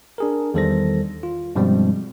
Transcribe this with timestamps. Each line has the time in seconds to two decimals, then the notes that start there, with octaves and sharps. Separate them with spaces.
0.18 D4 G#4 A#4
0.54 E2 D#3 G3 A4 C5 A#6
1.23 F4
1.55 G2 B2 F3 G3 G#3 C4